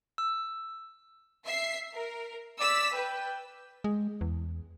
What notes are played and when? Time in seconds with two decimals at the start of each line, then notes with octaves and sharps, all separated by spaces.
0.18 E6
1.46 E5 C7
1.93 A#4
2.60 D5 E6 B6
2.94 B4 G5
3.84 G#3
4.21 E2